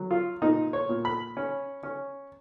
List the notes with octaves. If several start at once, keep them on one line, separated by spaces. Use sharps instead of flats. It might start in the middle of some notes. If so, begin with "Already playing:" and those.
Already playing: F#3
F4
A#2 D#4
C#5
A#2
B5
C#4
C#4